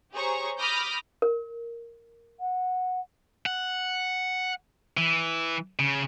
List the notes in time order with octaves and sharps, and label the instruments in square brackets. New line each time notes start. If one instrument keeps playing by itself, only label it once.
[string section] G4 G#4 C5 C#5 A#5 C#6
B5 D6 D#6 F6 G6 A#6
[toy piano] A#4
[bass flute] F#5
[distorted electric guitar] F#5
E3
C#3